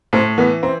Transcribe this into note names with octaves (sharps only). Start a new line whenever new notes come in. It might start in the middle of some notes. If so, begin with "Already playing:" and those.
A2 C4
E3 B3
C4